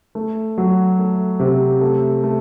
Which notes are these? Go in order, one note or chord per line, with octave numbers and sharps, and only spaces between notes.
A3
F#3
A3
C3
A3
A3